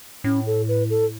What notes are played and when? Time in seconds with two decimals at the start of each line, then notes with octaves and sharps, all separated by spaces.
0.24 A2 C#4
0.47 A4
0.68 B4
0.90 A4